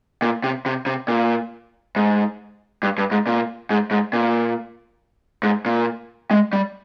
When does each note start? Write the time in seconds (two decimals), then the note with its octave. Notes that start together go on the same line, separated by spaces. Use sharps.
0.22 A#2
0.44 C3
0.66 C3
0.86 C3
1.08 A#2
1.96 G#2
2.83 G2
2.98 G2
3.12 G#2
3.27 A#2
3.70 G#2
3.91 G#2
4.13 A#2
5.43 G#2
5.66 A#2
6.31 G#3
6.53 G3